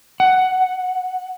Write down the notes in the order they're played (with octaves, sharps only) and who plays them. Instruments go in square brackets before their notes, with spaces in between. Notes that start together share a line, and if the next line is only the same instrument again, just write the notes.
[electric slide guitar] F#5